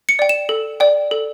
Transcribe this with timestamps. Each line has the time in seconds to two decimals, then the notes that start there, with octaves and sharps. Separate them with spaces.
0.09 C#7
0.19 D5 G5
0.29 E7
0.49 A4
0.80 D5 G5
1.11 A4